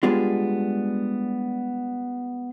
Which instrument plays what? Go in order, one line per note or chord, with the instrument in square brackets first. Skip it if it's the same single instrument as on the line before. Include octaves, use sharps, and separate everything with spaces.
[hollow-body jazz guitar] G3 G#3 B3 D4 F4 G#4